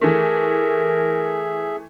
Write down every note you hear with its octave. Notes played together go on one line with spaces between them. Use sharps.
E3 A3 G#4 A#4 E5